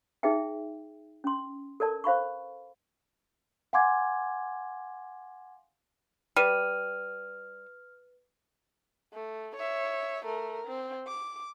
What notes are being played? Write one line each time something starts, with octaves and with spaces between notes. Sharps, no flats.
D#4 G#4 B4 E5 G5
C#4 C6
A4 A#4 D5 A5
C5 F5 B5 C#6
F5 F#5 G#5 C6 D6 G#6
G3 B4 F6 D#7
A3
C#5 E5
A3 A#4
C4
D6